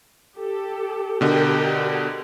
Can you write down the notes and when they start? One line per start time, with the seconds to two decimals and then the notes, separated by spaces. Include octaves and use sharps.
0.39 G4 A4
1.21 B2 D3 G4 A#4 D#5 G5